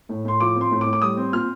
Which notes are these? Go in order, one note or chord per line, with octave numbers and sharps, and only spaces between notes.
A2
A2 C6
F3 D6
C4
C6
A2
D6
A2
D6
G3 D#6
C4
A#2 F6